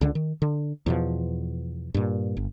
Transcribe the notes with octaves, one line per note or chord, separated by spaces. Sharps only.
C#2 D3 D4
D#3
D3
E2 B2 F3
G2 A#2
G1